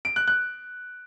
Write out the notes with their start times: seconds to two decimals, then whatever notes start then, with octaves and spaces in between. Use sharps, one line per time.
0.05 D7
0.16 F#6
0.28 F#6